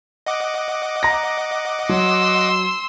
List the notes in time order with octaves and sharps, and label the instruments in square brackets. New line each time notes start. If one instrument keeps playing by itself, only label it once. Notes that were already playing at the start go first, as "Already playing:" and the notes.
[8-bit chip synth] D#5 F#5 D6
[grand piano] A#5 A#6
[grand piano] F#3 [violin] C6 E6